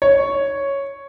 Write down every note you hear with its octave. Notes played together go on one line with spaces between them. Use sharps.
C#5